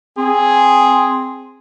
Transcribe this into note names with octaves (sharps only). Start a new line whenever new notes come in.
C4 G#4